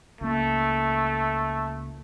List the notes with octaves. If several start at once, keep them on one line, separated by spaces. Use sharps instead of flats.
C#2 A3 A#3